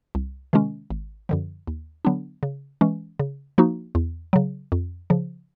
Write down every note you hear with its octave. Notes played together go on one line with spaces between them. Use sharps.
C2
C3 D#3 G#3 C#4
G#1
F#2 D3 F3
D#2
D3 F#3 B3 D4
C#3
E3 G#3 C#4
C#3
F3 A#3 D#4 F#4
E2
C#3 F#3
F2
C#3 F3